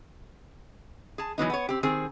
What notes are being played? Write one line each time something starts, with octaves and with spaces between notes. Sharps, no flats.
G#4 A5
E3 F#3 B3 D#4
B3 C#5
C4 G4
D#3 C4 G#4